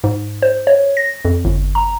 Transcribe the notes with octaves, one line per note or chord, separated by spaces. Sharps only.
G#2
C5
C#5
A#6
F2
G1
A#5